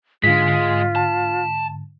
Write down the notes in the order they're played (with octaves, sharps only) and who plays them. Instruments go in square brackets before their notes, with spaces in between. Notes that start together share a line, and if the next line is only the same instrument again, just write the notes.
[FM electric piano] G#2 D3 [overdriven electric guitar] G#3 [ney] F4 [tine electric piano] B6
[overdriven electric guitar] A5